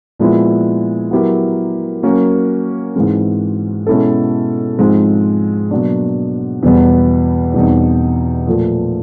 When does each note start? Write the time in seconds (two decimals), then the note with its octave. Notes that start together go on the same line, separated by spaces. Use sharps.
0.19 A#2 F3 G#3 B3 E4
1.11 F#3 B3 E4 G4 A#4
2.03 F#3 A#3 C#4 F#4 A#4
2.96 G#2 E3 G#3 C4
3.87 B2 G#3 C#4 E4 A4
4.79 G#2 F3 G#3 C4
5.71 B2 F#3 A#3 D4
6.63 E2 B2 G3 B3
7.54 E2 B2 G3 C4 D#4
8.47 A#2 F3 A3